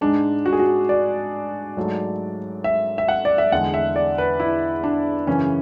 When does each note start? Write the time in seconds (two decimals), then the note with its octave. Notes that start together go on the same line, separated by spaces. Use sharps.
0.01 G#2 G#3 D4
0.46 F#4
0.53 G#4
0.59 F#4
0.89 D5
1.77 G#2 F#3 A3
2.64 E5
2.98 E5
3.08 F#5
3.25 D5
3.38 E5
3.52 E2 D3 G#3 F#5
3.74 E5
3.96 D5
4.18 B4
4.40 E4
4.84 D4
5.27 F#2 C#3 E3 C#4